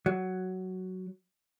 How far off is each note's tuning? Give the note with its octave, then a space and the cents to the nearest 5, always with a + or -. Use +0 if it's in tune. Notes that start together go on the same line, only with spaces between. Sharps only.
F#3 +5